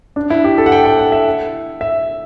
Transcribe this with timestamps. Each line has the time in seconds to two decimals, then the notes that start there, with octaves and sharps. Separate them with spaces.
0.16 D4
0.30 E4
0.44 G4
0.58 A4
0.66 F#5
0.72 G5
0.85 G5
0.99 F#5
1.12 E5
1.81 E5